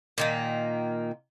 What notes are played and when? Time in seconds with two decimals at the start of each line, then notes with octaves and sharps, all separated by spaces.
0.18 A#2 D#3 A#3